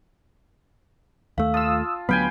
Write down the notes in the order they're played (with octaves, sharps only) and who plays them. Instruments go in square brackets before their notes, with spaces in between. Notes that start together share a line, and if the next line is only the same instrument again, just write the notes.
[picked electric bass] D#2 A3 [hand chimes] F5 E6
[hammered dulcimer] F4 [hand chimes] A5 [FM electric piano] D#6 E6
[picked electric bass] D2 F#3 B3 [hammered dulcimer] F5 G5 G#5 [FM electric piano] B5